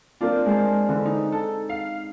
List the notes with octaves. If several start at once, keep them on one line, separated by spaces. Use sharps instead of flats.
A#3 C4 D4 F4
G#3 C5 A5
D3 E3
D#4
A4
F5